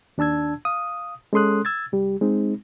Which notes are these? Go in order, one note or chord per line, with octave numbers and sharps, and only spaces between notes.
D#2 D4 A5 E6 G#6
F5 D#6
G#3 C#4 A4 C6 D#6 F#6
E6 G#6 A6
C2 G3 G4
G#3 C4 D#4